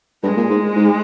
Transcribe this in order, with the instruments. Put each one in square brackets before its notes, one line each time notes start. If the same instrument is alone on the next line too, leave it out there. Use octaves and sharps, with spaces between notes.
[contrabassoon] G2 [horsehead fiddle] G#3
[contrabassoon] A#2
G#2
G#2